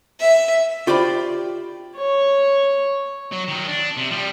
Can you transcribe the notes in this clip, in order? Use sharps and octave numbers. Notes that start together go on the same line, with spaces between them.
E5
F4 G4 C5 D5 B5
C#5
F#3
D#3 F#3
D4
C3
F3 G3